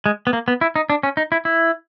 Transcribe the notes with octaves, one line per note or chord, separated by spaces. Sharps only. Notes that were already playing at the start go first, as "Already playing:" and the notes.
G#3
B3
A#3
B3
E4
D#4
D4
C#4
D#4
E4
E4